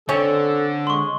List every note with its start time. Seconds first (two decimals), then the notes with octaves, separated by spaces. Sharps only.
0.09 D3 C4 C#4 A4 C#5
0.87 G#3 C6 C#6